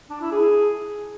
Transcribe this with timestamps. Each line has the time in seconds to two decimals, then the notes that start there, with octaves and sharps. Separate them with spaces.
0.10 D4
0.21 E4
0.32 G#4